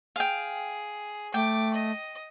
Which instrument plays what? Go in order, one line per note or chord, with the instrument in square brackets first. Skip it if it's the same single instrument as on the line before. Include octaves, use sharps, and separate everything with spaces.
[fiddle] G#4 [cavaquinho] F5 G5
[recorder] A3 [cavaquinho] G5 [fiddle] D6
[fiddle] D#5